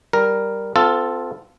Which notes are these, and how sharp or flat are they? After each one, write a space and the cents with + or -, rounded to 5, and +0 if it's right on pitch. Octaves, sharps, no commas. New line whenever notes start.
G3 +0 A#4 +0
C4 -35 F4 +0 A4 +0